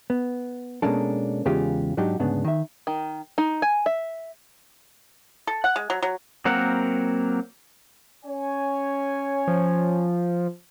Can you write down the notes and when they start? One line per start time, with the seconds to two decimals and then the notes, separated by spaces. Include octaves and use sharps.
0.10 B3
0.82 B2 G#3 A#3 C#4 D4 A4
1.46 E2 C#3 G#3 F4 G4
1.97 G#2 F#3 D4 D#4 F#4 G4
2.19 D2 G#2 C#3 B3 D4
2.45 D#3 E5
2.87 D#3
3.38 D#4
3.62 G#5
3.86 E5
5.47 A4
5.64 F#5
5.76 G#3
5.90 F#3
6.02 F#3
6.45 F#3 A#3 C4 A#4 F#5
8.25 C#4 C#5 G#5
9.48 F3